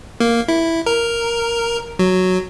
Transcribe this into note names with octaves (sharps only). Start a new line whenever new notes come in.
A#3
E4
A#4
F#3